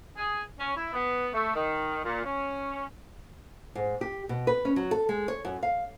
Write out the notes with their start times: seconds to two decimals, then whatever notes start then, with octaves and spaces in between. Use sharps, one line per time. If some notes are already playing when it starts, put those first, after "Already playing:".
0.17 G#4
0.59 C#4
0.77 E4
0.93 B3
1.34 A3
1.56 D#3
2.04 A#2
2.25 C#4
3.75 G#2
4.01 G4
4.29 B2
4.47 B4
4.65 C#4
4.76 F#3
4.91 A4
5.09 G#3
5.28 C#5
5.45 F#2
5.63 F5